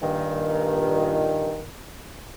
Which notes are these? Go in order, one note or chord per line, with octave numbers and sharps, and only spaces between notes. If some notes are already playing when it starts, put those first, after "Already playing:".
G2 A#2 D#3